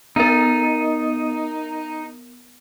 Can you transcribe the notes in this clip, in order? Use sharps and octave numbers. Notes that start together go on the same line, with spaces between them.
B3 D#4 A#4